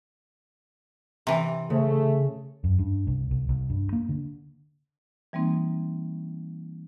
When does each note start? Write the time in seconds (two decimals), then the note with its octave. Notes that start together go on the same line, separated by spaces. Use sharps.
1.27 C3 E3
1.70 C#3 A3
2.64 F#2
2.79 G2
3.07 C2
3.31 C2
3.49 C2
3.70 G2
3.93 A#3
4.09 D3
5.33 E3 G3 A#3 C4 D#4